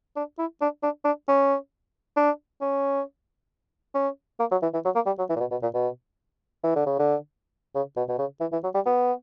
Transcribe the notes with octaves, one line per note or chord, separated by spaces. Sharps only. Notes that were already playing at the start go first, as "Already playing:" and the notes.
D4
E4
D4
D4
D4
C#4
D4
C#4
C#4
A#3
F#3
E3
E3
F#3
A#3
G3
F#3
E3
A#2
B2
B2
A#2
B2
E3
D3
C#3
D3
C#3
B2
B2
C#3
E3
E3
F#3
G3
B3